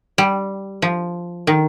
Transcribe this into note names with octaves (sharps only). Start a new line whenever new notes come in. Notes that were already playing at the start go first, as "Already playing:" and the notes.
G3
F3
D#3